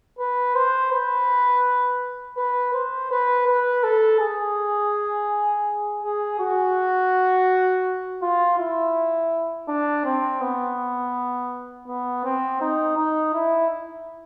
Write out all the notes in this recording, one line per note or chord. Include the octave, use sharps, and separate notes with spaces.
B4
C5
B4
B4
C5
B4
B4
A4
G#4
G#4
F#4
F4
E4
D4
C4
B3
B3
C4
D#4
D#4
E4